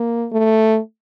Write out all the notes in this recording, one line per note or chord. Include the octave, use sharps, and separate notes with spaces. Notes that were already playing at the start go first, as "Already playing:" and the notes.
Already playing: A#3
A3